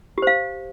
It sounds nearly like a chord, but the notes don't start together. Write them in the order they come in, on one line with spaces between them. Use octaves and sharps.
G4 C5 F5